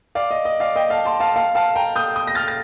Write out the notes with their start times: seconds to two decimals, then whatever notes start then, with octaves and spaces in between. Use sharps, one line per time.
0.15 D5 F5
0.31 D#5
0.45 D#5
0.60 D5 F5
0.76 D#5 G5
0.90 F5 A5
1.05 A5 C6
1.20 F5 A5
1.36 F5 A5
1.55 F5 A5
1.75 G5 A#5
1.96 D#6 G6
2.16 D#6 G6
2.27 A#6
2.35 F6 A6
2.48 A6